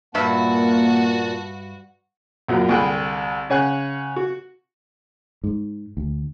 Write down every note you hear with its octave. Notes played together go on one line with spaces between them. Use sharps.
G2 A#2 A#3 F#4 E5 F#5 A5
A#1 F#2 F3 F#3
C2 D3 G#4 F#5 G5 B5
C#3 C#4 C#5 F#5 G#5 F#6
F#4
G#2
D2